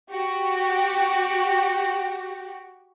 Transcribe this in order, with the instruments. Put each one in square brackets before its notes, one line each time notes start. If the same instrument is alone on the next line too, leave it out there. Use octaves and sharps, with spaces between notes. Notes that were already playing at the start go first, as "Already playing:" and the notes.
[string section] F#4 G4